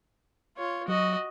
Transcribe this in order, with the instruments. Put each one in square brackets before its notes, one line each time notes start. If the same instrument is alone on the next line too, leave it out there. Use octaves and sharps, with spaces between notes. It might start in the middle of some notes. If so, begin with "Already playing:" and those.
[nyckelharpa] F4 C#5
[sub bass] F#3 [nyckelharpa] F#4 D#5